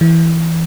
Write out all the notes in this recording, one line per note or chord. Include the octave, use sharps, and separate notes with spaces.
E3